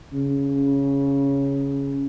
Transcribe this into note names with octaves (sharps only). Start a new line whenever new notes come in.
C#3